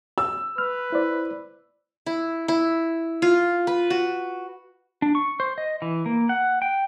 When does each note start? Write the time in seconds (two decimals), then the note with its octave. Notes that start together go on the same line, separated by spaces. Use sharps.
0.18 E6
0.58 B4 F6
0.92 E4 C5 D5
2.06 E4
2.48 E4
3.22 F4
3.67 B4
3.90 F#4
5.02 D4
5.15 C#6
5.40 C5
5.58 D#5
5.82 E3
6.06 A#3
6.29 F#5
6.62 G5